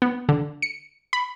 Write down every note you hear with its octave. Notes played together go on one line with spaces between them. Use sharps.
B3
D3
C#7
B5